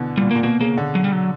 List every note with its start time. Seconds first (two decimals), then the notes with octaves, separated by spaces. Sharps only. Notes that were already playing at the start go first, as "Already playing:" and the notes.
Already playing: B2 D3 E3
0.17 A#2 G3
0.31 A#3
0.35 A#2
0.43 B2 A#3
0.61 C#3 A#3
0.77 D3
0.95 F#3
1.04 G3
1.13 F#3